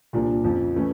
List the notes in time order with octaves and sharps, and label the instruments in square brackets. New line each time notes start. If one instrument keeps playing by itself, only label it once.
[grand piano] C2 A#2 F3 A#3 D4
F2 C#3 F3
C#3 E3 A3 C#4